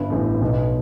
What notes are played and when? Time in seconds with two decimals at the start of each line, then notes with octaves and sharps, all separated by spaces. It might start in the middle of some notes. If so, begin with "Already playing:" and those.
Already playing: G1 G2
0.10 A1 A2
0.41 B1 B2